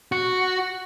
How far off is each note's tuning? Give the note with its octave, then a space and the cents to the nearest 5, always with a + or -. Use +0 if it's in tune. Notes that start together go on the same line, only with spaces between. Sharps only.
F#4 +0